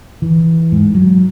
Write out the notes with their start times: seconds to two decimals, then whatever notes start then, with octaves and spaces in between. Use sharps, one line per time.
0.22 E3
0.72 G#2
0.95 F#3